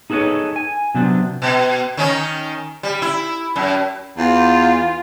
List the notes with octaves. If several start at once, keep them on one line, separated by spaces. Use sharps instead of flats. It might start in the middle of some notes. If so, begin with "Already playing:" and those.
D#4 G#4 A4 B4 C#5 D#5
G#5
C3 F#3 B3 C4 D4
B2
D#3 C#4 D#4
G3
E4
F#2
E2 F4